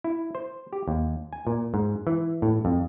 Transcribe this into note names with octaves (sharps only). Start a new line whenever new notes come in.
E4
C5
G4
D#2
G#5
A#2
G#2
E3
A2
F2